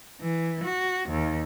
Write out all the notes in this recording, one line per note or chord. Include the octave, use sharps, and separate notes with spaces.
E3
F#4
D#2